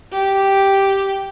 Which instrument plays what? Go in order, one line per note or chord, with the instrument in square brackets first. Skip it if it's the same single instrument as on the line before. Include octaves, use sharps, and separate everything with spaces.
[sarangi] G4